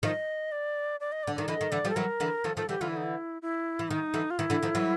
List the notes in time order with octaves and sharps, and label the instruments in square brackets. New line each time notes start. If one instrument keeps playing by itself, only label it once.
[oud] D#3 F3 [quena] D#5
[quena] D5
D5
D#5
D5
[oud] D3
[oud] D#3 [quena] D5
[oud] D3 E3 [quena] D#5
[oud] D#3
[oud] D3 E3 [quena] D5
[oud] F3 G3
[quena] A4
[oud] E3 F#3 [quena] A#4
[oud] D3 E3
[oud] D#3 F3 [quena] A4
[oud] D#3 F3 [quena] A4
[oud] D3 E3 [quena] G4
[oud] D3 E3 [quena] F4
[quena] E4
D#4
E4
E4
[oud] E3
[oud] D#3 [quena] D#4
[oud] D3 E3
[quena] F4
[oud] D#3 [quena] E4
[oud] D3 E3
D#3 F3
E3 F#3